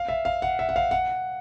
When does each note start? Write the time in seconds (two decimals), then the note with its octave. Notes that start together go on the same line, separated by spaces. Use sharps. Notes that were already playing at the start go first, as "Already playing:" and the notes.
Already playing: F5
0.09 E5
0.25 F5
0.42 F#5
0.59 E5
0.69 F#5
0.76 F5
0.91 F#5